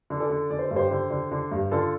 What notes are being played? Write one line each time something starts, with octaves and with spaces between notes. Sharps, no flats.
D3
A4 D5
D3
D3 D5
C5
G2 A4
G4 C5
D3
D3
D3
G2
D3 F4 A4